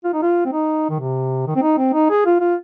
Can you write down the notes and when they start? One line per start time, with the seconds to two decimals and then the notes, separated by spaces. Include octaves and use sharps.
0.04 F4
0.13 D#4
0.22 F4
0.45 C4
0.52 D#4
0.90 D#3
1.00 C3
1.47 D#3
1.56 C4
1.62 D#4
1.78 C4
1.93 D#4
2.10 G#4
2.26 F4
2.40 F4